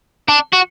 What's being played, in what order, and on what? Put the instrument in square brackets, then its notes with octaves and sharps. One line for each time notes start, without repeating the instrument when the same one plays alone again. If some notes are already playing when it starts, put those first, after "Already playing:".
[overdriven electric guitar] D4
F#4